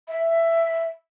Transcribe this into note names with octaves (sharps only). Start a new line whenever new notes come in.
E5